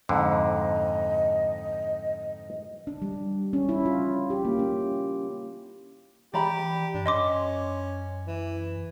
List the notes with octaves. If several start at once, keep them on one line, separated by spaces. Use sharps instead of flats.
F2 G#2 D3 D#5
D4
G3
C#4
E4
F4
G4
A#3
C#4
E3 G4 D5 A#5 B5
G2 D4
F#2 C#4 D#5 C6 D6
E3